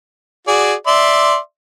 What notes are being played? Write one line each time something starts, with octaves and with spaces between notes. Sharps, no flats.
F#4 G#4 D5
D5 E5 C6